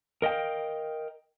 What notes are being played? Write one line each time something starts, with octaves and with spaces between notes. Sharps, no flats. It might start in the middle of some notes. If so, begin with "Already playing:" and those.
A#4 D#5 F5 G5